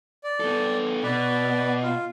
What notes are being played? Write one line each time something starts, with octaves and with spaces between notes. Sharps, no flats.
D5
B3 A4
B2 B4 D5
F4